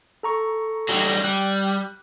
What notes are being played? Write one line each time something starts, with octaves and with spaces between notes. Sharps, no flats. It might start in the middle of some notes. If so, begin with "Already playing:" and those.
A4 A#5 C#6
F#3 G3 D#4
G3 F#6